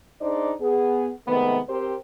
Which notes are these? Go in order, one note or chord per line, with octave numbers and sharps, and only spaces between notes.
D4 D#4 G#4 C5 D5
B3 G#4
C3 D#3 G#3 A3 B3
C4 G4 A#4 C5